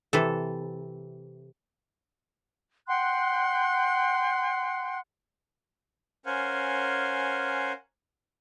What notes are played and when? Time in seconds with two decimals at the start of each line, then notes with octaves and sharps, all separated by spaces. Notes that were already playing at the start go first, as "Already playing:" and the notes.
0.13 C3 E3 A4
2.88 F#5 G5 C6 F#6
6.26 C#4 A#4 C5 F5 F#5 G#5